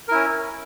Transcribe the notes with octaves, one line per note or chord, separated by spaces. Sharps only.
C#4 E4 A#4